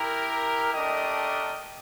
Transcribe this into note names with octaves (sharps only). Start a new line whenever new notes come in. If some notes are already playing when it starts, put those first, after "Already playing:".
Already playing: E4 G4 A#4
A3 D4 G4 A#4 D#5